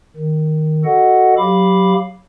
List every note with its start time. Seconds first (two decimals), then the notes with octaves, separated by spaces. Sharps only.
0.16 D#3
0.85 F#4 A4 D#5 F#5
1.38 F#3 G4 F5 B5 D6